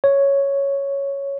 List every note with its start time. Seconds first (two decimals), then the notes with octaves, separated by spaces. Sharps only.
0.04 C#5